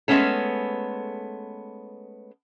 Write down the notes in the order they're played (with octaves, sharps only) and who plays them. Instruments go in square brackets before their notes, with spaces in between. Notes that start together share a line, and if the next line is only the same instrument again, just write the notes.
[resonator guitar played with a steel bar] G#3 A3 B3 C#4 A4